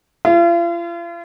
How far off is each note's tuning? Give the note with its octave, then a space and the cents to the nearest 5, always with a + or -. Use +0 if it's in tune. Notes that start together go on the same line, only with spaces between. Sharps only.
F4 -40 F5 -45